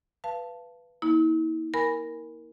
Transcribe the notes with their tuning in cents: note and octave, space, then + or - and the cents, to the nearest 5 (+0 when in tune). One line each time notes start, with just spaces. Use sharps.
B4 +0 F5 -25 A5 +0
A#3 +25 E4 -45
A#4 +0 G#5 -15 B5 +0